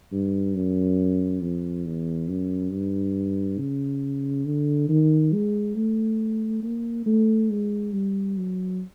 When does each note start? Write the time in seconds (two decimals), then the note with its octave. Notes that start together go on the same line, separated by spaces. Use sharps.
0.11 G2
0.55 F#2
1.41 F2
1.85 E2
2.28 F#2
2.72 G2
3.59 C#3
4.45 D3
4.89 D#3
5.33 G#3
5.75 A3
6.63 A#3
7.06 A3
7.50 G#3
7.93 G3
8.37 F#3